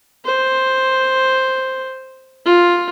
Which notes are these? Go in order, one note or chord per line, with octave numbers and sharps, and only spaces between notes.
C5
F4